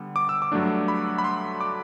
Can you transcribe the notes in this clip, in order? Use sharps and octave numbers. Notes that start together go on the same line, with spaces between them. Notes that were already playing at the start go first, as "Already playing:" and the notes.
Already playing: D3 G3 B3
D6
E6
D6
G2 F#3 A3 D4
B5
B5
C6
D6